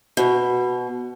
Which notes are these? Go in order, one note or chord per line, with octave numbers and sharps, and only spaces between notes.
B2